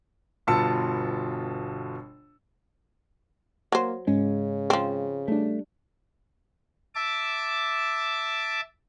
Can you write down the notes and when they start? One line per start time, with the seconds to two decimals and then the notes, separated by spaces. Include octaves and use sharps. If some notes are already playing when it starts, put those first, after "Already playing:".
0.47 G1 B2 F4 A5 E6 C#7
3.72 F#3 A#3 C5
4.07 G#2 C#3 G#3 C#4
4.70 F3 C4
5.28 G3 A3 D4
6.95 E5 A5 D6